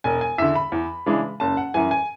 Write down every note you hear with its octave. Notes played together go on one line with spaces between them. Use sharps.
E1 G#5
G#5
E2 D3 E5
B5
E2
C#3 E3 G#3 D4
F#1 A5
F#5
F#2 E3 G#5
G#5